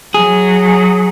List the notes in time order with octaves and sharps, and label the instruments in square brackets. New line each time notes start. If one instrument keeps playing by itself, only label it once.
[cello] F#3 [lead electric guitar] G#4